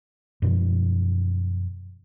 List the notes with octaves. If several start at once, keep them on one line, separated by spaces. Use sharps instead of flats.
F#2 B2 F3